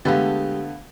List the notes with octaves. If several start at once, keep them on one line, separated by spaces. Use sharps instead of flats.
D3 G#3 A3 B3 G4 F5 F#5 A6